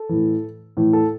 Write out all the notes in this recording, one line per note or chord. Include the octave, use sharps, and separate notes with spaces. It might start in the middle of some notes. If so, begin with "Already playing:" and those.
Already playing: A4
A2 E3
A2 E3
A4